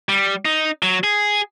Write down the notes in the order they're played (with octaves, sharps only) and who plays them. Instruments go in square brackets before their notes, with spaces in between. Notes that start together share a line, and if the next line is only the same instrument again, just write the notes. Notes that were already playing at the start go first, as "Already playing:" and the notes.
[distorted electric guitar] G3
D#4
F#3
G#4